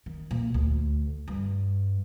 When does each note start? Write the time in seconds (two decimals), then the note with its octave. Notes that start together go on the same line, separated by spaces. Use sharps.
0.06 D#3
0.31 A#2
0.54 D2
1.28 G2